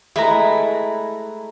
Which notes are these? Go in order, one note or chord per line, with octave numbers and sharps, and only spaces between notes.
G#3 A3 E4 B4 A#5